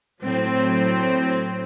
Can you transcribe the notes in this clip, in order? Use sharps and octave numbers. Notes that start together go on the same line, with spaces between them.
A2 F#3 C4